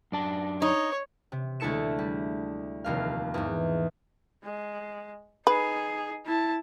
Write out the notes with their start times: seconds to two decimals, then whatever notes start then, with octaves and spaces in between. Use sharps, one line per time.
0.12 F#2 D4 A5
0.62 D#4 C#5
1.32 C3
1.60 D2 G#3 E4 A4 C#7 E7
1.99 G3
2.84 F1 D#2 F5
3.34 E2 G#2
4.44 G#3
5.47 D#4 G#4 B4
6.25 E4 A5